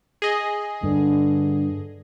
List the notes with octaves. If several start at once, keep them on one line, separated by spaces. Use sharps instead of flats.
G#4 D#5
G2 D3